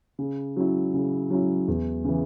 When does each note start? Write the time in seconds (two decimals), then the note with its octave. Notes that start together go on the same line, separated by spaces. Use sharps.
0.19 C#3
0.57 F#3 C#4 E4
0.94 C#3
1.30 F#3 C#4 E4
1.68 E2
2.04 C#3 E3